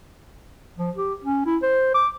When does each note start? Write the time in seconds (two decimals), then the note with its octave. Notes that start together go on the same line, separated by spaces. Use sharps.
0.78 F3
0.96 G4
1.24 C#4
1.46 E4
1.62 C5
1.94 D6